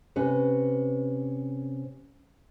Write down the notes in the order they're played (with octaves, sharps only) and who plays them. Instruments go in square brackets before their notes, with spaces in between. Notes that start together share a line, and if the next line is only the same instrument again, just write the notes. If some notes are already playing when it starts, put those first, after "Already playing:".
[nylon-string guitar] C3 C#4 B4 C#5